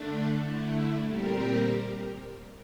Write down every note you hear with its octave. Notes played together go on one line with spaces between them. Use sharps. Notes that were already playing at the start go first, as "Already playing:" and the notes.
Already playing: D3 A3 D4
D3 A3 E4
A#2 G3 C4 G4 A#4